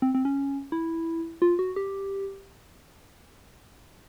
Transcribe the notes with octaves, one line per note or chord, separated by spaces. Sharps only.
C4
C4
C#4
E4
F4
F#4
G4